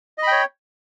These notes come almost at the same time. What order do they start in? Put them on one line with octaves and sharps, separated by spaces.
D#5 B5 G5 C#5